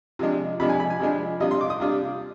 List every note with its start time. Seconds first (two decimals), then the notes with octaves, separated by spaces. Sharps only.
0.19 C3 F3 G#3 D4
0.60 C3 F3 G#3 D4 B5
0.69 G#5
0.80 B5
0.90 G#5
0.99 C3 F3 G#3 D4
1.40 C3 G3 D4 F4 D#5
1.51 C6
1.61 D6
1.70 D#6
1.80 C3 G3 D4 F4